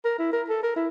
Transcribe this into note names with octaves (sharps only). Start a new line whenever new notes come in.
A#4
E4
A#4
A4
A#4
E4